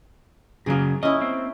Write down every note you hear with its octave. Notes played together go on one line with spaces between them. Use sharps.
F#2 C#3 F#3 A#3 G#4
C#4 E4 D#5
C4